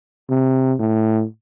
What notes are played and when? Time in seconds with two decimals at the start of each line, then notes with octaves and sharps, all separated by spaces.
0.30 C3
0.80 A2